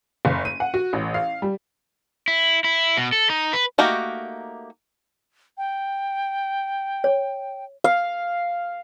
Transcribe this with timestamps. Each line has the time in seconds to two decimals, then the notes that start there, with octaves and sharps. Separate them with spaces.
0.25 F#1
0.45 D#7
0.60 F#5
0.74 F#4
0.93 A1
1.14 F5
1.42 G3
2.28 E4
2.64 E4
2.97 B2
3.12 A4
3.30 D#4
3.53 B4
3.78 A3 A#3 D#4 F#4 G4
5.58 G5
7.04 C#5
7.84 F5